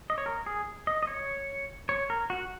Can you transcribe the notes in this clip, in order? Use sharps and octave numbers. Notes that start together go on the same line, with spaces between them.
D#5
C#5
A#4
G#4
D#5
D#5
C#5
C#5
A#4
F#4